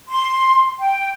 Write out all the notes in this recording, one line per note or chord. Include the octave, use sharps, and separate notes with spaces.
C6
G5